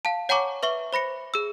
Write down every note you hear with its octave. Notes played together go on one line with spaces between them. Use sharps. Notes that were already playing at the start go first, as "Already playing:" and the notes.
F5 A5
C#5 F#5 G#5 A#5 C#6 D6
B4 E5 C#6 G7
C5 B5 A#6 C#7
G#4 E6